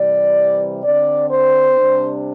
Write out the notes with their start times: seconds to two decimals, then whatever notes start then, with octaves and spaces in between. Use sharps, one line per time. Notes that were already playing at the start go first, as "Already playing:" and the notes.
Already playing: C3 E3 G3 D5
0.83 D3 C4 D5
1.30 C5
1.76 C3 G3 D4